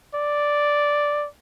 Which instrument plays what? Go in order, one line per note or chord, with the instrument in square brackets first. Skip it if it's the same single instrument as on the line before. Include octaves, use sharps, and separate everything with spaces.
[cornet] D5